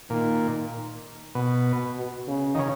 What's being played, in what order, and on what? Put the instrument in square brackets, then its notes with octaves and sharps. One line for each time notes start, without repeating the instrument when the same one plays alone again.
[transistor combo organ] A#2 [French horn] D#3
[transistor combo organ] B2
[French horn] B2
C#3
[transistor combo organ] D#3
C#3